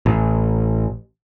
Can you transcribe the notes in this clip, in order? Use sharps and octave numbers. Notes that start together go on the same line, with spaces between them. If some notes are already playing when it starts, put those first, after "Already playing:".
A1